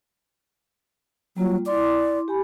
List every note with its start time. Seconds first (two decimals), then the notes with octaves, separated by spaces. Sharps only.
1.37 F#3 G3 A#3 F4
1.66 E4 D5 C6 D6
2.28 G4 G#5 B5